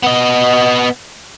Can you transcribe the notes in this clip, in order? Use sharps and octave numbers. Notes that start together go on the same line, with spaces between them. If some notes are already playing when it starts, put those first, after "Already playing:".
B3 D#5